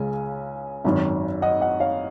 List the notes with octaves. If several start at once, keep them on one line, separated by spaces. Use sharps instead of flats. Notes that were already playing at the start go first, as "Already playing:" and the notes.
Already playing: C#2 C#3 G#3 G#5
G#1 F#2 D#3
D#5 F#5
D#5 F#5
C#5 F5